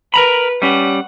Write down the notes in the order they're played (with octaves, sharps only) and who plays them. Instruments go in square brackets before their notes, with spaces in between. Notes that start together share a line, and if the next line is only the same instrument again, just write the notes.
[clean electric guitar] A#4 A#5 B5 [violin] B4
[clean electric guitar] G3 C#4 G4 [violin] F#5